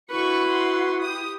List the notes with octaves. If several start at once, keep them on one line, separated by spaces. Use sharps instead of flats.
D3 E4 F#4 B4 C#6
F#5 C6
G4 D#6